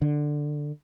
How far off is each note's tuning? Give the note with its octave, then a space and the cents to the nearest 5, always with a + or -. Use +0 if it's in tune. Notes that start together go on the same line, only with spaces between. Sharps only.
D3 +10